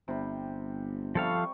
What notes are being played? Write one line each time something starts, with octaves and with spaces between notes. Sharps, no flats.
G1 C3 G3
C3 F3 G3 A4 F5 C#6